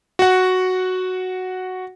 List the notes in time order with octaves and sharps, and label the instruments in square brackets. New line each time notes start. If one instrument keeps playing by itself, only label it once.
[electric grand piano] F#4 F#5